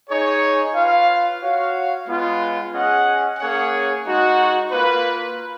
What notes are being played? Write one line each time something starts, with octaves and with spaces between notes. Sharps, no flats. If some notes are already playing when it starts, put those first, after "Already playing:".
D#4 G#4 C#5
F4 B4 F5
F#4 C#5 F5
G#3 B3 F4
C#4 G#4 D#5 F#5
A#3 C#4 G#4 C#5 F#5
G#3 D#4 F#4
A#3 F4 B4